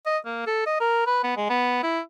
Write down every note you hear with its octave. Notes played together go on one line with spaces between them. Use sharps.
D#5
A#3
A4
D#5
A#4
B4
B3
G#3
B3
E4